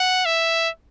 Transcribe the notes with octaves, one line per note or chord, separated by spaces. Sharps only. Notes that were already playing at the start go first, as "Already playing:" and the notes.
Already playing: F#5
E5